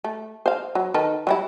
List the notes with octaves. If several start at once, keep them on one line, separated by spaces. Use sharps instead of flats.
A3
C5 F5
F#3
D#3 A4 B4
F#3 G3 E4